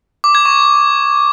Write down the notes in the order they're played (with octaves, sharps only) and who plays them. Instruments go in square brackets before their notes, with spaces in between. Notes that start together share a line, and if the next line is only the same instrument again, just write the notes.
[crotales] D6
G#6
C#6